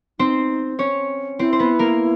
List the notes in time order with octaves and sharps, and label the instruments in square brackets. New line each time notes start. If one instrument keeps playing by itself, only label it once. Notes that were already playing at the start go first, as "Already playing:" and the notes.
[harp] C4 C5 [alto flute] D#4
[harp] C#4 C#5
[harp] C4 C5 [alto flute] E4
[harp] C5
B3 B4
A#3 A#4